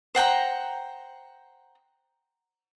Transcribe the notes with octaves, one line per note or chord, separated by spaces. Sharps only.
C5 F#5 G5 A#5